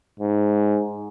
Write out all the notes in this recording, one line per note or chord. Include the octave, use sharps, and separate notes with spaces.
G#2